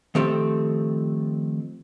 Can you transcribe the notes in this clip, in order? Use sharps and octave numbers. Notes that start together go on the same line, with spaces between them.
D#3 F3 A3 C4 G4 A4